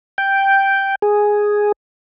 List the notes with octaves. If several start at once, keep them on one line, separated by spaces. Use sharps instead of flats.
G5
G#4